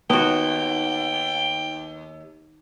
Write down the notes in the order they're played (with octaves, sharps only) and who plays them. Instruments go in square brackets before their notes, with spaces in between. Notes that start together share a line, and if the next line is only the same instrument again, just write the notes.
[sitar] D#2 [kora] B3 F#4 [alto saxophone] G5